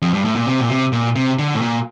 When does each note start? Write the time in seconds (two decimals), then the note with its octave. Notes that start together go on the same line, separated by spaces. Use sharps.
0.02 F2
0.14 G2
0.25 A2
0.36 A#2
0.46 C3
0.60 A#2
0.69 C3
0.92 A#2
1.16 C3
1.39 D3
1.55 A2
1.61 A#2